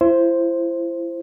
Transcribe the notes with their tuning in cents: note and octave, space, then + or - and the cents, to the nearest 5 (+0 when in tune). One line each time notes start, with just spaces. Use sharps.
E4 +35 C5 +5